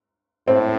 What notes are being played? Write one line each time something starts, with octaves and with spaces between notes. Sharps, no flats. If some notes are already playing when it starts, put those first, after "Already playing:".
A2 C4